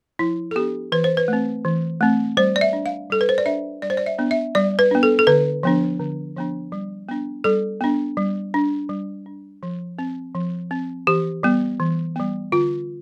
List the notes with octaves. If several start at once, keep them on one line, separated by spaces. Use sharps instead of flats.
F3 E4
A4
B3 D4 G4
E3 B4
C5
B4
A3 C4
E3
A3 C4
G3 C5
D5
E5
D4
F5
G3 A4
B4
C5
D5
D4 E5
G3 D5
C5
D5
E5
B3 D4
E5
G3 D5
B4
B3 D4
A4
A4
D3 B4
F3 B3 D4
D3
F3 B3 D4
G3
B3 D4
G3 A4
B3 D4
G3
D4
G3
D4
F3
C4
F3
C4
E3 G4
G3 B3
E3
G3 B3
D3 F4